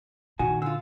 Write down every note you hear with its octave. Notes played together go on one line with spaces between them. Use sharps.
A#2 D#3 F#4 G#5
D3 F4 E6